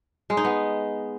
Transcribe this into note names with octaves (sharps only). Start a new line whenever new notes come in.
G#3
D#4
B3